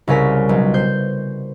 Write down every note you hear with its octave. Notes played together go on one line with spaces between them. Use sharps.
C2 C#3 C#4 A#4 B6
B1
C5 G6